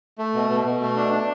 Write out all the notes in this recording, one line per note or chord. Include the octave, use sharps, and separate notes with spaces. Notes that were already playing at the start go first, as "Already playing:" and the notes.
A3
B2
B2
B2
A3
D4
D4